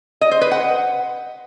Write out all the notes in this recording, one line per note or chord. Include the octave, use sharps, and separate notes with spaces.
D#5
C5
B4
F#5